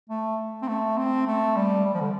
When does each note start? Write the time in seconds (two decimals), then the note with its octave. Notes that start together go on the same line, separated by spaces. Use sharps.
0.09 A3
0.62 C4
0.68 A3
0.97 C4
1.27 A3
1.56 G3
1.85 G3
1.94 F3
2.01 D3